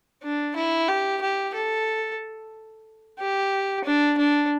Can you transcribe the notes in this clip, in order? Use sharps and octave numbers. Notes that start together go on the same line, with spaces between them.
D4
E4
G4
G4
A4
G4
D4
D4